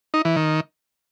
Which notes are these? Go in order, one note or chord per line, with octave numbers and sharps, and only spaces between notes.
D#4
E3
D#3